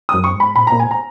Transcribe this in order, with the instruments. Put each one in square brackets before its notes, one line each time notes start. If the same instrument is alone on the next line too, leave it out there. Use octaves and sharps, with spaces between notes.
[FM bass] F#2 [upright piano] D#6
[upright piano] C#6
[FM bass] G#2
[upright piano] B5
[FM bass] A#2 [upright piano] B5
[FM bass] A#2 [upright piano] A#5
[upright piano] G#5
A#5